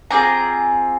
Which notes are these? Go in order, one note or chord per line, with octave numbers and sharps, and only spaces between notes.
C4 F4 G#4 A#5 D6